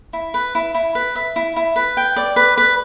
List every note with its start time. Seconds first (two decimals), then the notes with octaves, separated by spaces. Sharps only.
0.13 E4
0.34 B4
0.55 E4
0.75 E4
0.95 B4
1.15 E5
1.36 E4
1.56 E4
1.76 B4
1.97 G5
2.16 D5
2.36 B4
2.58 B4